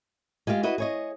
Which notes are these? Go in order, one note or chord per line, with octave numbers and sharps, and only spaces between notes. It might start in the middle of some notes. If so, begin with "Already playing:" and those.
G#3 F4 G4 F5
E4 F#4 B4 D#5
G#4 C#5 D#5